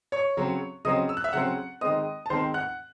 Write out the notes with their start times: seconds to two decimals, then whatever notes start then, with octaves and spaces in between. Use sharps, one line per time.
0.12 C#5 C#6
0.37 C#3 F#3 C4
0.85 C#3 F#3 C4 D#5 D#6
1.09 E6
1.17 F#6
1.24 E5 E6
1.33 C#3 F#3 C4 F#5 F#6
1.81 D#3 G#3 C4 D#5 D#6
2.26 A5
2.30 D#3 G#3 C4 C5 C6
2.54 F#5 F#6